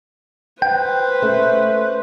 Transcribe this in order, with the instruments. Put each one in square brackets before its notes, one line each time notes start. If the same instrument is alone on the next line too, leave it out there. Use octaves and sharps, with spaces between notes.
[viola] B4 C5 [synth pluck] G5
[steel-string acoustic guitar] A3 C#4